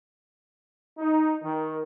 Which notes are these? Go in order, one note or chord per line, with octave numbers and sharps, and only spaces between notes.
D#4
D#3